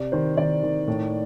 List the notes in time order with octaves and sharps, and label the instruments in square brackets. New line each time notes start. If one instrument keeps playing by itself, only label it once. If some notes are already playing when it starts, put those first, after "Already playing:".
Already playing: [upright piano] C3 D5
D#3 C5
D#3 D5
D#3
A2